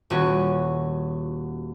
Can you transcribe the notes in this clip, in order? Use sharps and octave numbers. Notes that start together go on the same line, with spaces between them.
D#1 C#4 F#4